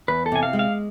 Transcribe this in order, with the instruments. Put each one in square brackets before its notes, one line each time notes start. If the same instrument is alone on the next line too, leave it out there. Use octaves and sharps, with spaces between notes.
[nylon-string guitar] E2 [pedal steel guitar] B4
[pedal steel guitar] A4
[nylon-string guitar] C3 [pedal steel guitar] G#5
[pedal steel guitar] F5
[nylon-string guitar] G#3
[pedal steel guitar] F5